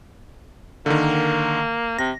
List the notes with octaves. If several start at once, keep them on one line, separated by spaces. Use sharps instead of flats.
D3 D#3 A#3
C3 A#6